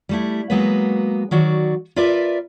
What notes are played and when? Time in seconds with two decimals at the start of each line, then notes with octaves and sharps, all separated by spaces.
0.09 G3 A3 E4
0.50 F#3 G#3 A#3 B3 F#4 B4
1.31 D#3 F#3 F#4 D5
1.96 F4 A#4 B4 D5 E5